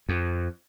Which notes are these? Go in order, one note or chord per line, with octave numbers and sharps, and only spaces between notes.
F2